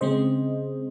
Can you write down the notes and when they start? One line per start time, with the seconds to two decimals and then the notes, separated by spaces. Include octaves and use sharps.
0.01 C#3 G#3 C4 C5 D#5